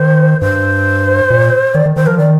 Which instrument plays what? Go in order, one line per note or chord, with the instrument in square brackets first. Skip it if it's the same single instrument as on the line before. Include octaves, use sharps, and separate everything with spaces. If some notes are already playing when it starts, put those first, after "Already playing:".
Already playing: [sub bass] D#3 [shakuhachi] C5
[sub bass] G2 [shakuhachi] C5
[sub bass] A#2
[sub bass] D#3 [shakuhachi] D5
[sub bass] D#3
[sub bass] D#3 [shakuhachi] C5
[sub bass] F3 [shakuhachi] A#4
[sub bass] D#3 [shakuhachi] D5